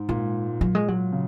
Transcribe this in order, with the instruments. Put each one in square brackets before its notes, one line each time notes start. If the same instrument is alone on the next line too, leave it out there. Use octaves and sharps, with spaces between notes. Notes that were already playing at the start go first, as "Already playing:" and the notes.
Already playing: [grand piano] G#2
[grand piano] A#2 [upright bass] G#3
[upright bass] F#3
G#3
F#3
[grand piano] C#3